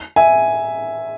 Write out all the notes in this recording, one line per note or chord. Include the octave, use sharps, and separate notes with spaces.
E5 G#5